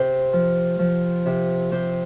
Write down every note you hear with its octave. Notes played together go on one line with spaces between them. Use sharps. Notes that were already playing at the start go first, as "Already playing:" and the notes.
Already playing: C3 C4 C5
F3
F3
C3
C3 C4 C5